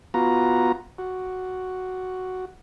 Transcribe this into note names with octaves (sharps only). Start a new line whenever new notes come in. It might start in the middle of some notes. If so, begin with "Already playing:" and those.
B3 F4 F#4 A#5
F#4